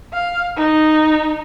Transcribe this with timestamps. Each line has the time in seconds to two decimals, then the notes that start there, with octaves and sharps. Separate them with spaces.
0.14 F5
0.57 D#4